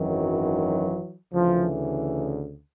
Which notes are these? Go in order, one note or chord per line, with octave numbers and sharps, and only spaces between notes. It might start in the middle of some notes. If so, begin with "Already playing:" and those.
Already playing: G#1 F#2 D#3 E3 F#3
D2 C#3 E3 F3